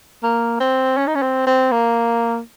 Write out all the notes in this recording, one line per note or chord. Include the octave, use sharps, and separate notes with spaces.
A#3
C4
C#4
D#4
C#4
C4
C4
A#3